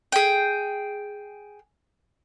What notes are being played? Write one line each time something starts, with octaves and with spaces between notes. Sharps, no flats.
G#4 G5